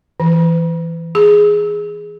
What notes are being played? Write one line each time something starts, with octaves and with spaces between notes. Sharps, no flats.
E3
G#4